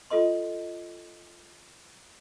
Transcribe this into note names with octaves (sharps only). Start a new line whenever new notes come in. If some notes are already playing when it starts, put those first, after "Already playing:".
F4 A4 D#5 C6